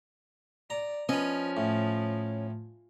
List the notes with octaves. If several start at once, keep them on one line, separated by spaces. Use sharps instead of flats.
D5 A#5
F3 C#4 B4 D#5
A2